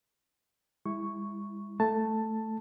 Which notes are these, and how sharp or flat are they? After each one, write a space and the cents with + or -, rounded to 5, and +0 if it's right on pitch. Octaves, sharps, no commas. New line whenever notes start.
G#3 -40 E4 +0 C#6 +0
A3 +0 A5 +5